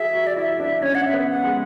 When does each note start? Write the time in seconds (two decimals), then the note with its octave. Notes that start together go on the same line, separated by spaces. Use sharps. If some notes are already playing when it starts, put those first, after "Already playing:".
Already playing: F#4 G#4 E5
0.14 F#4
0.27 D5
0.37 E4 E5
0.60 D4
0.82 C#4 C#5
0.95 F#5
1.06 E5
1.13 B3
1.29 F#5
1.44 G#3